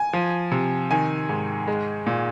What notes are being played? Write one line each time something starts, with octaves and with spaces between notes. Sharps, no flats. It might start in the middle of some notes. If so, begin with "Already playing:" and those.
Already playing: G#5
F3
C3
D#3 G#5
G#2
G#3
A#2